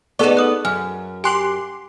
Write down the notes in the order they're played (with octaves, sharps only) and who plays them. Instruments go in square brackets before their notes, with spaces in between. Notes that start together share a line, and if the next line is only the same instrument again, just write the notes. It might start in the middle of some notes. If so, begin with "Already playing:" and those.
[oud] B3 D#4 [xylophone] G#4 C#6 [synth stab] A4 D5
[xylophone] B4 D#6 F#6
[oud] F#2 [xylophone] G#5 F6
[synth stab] G4 C6 D6 [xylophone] G#5 F#6 F#7